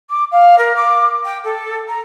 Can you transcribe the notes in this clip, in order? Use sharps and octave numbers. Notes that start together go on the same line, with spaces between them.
D6
F5
A#4
D6
G5
A4
A#5